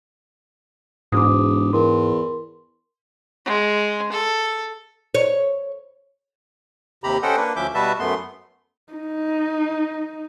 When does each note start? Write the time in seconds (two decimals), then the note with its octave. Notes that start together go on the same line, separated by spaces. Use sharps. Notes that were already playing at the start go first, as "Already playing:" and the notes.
1.12 E1 G#2 D6 D#6
1.73 E2 A#4 C6
3.46 G#3
4.12 A4
5.15 C#5
7.04 D#2 C3 G4 A#5 B5
7.23 C#4 A4 C5 D#5 F#5 G5
7.36 A#3 D4 B4
7.56 D2 F3 C#4 E5 D6 G6
7.74 B2 G3 F#4 B4 E5 A5
8.00 F#2 A3 B3 C6
8.93 D#4